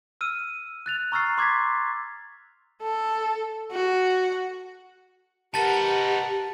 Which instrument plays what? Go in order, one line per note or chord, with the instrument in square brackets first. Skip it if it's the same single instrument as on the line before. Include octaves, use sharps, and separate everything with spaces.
[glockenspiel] E6 F6 D#7
F#6 A6 F7
A#5 C#6 E6 F6 A6 C7
C6 D6 G#6 A6 B6
[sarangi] A4
F#4
[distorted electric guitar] D#4 B4 [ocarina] G4 [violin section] A#4 F#5 [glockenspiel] A5 A6